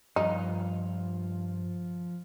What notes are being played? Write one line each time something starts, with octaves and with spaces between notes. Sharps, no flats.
G2 F3 D#4 F4